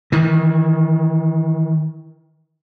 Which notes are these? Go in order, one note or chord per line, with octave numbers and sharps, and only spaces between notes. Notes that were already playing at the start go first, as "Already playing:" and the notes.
D#3 E3